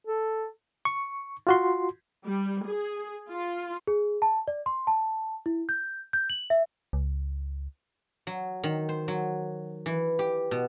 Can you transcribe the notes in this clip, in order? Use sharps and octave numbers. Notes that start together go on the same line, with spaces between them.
A4
C#6
F4 F#4 C6
G3
G#4
F4
G#4
A5
D5
C6
A5
E4
G6
G6
F#7
E5
C#2
F#3
D#3
C5
F#3
E3
G4
B2